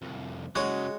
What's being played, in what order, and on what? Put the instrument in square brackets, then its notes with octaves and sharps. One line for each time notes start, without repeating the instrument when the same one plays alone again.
[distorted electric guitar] C2 F2
[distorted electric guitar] C#3 F#3 [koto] G#3 [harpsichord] F#4 C#5